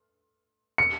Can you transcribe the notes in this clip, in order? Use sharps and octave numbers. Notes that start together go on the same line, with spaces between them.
C#7